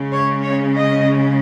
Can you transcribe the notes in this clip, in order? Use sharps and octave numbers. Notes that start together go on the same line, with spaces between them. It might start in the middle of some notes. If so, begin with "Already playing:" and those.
Already playing: C#3 G#3 C#4
C#5
C#5
D#5